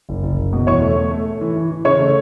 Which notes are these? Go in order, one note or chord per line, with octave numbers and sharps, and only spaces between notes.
F#1
F#1
F#1
B2
E2 C#5 C#6
A3
A3
A3
A3
E3
E3
E3
C#3 C#5 C#6
A3